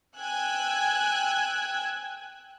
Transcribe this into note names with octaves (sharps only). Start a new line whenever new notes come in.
G5 G#5 E6 F#6 G#6